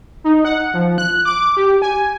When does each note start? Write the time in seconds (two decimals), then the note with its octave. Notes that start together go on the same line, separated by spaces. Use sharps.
0.24 D#4
0.45 F#5
0.74 F3
0.98 F#6
1.25 D6
1.57 G4
1.82 G#5